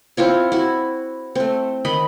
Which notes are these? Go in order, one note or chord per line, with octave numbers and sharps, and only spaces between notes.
C4 E4 F4 C#5
E4 F#4
A3 C4
D#3 D#5 B5